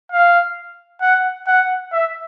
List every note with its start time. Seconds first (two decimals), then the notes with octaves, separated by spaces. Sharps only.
0.12 F5
1.01 F#5
1.47 F#5
1.92 E5